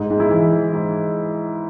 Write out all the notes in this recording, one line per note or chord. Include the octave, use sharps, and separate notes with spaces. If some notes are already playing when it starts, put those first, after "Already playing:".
Already playing: G#2
G#2
E4
E3
E3
G#2